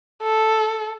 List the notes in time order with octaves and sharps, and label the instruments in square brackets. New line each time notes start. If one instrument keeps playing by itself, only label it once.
[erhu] A4